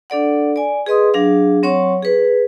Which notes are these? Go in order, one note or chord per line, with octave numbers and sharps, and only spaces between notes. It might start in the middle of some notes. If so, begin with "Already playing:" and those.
D4 A4 D5 F#5
D5 G#5
G#4 B4 D#5 C6 D#6
F#3 D4 G#4 F5
F#3 C4 C#5 F#5 C#6
G#4 B4